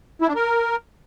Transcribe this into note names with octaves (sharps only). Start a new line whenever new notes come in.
E4
D4
A#4